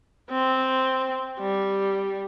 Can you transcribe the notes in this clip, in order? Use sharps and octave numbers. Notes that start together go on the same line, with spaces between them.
C4
G3